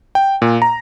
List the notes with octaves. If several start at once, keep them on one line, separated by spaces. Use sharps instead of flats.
G5
A#2
A#5